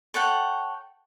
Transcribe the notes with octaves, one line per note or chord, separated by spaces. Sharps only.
A4 C#5 F#5 G5